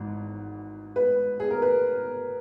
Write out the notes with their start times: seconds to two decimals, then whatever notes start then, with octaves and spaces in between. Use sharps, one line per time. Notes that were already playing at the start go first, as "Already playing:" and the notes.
Already playing: G#1 G#2 E3
0.96 B4
1.40 G#4
1.51 A#4
1.62 B4